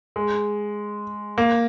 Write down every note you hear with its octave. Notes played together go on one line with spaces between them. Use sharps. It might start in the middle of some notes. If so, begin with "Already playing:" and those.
G#3
A#3